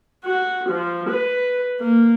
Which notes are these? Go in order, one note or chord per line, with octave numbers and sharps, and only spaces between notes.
F#4
F3
B4
A#3